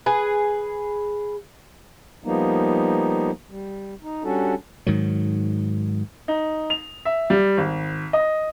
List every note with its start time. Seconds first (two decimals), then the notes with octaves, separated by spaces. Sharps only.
0.06 G#4 B4
2.24 F3 G3 A#3 B3 D#4
3.50 G3
4.03 D#4
4.24 G3 C#4 D4 F#4 A4
4.87 G#2 D#3 F#3
6.28 D#4
6.70 F7
7.05 E5
7.30 G3
7.57 G#1
8.13 D#5